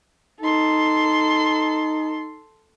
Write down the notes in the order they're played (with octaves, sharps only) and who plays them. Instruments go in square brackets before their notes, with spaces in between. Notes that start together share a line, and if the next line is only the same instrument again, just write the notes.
[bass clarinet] D#4 [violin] A4 C6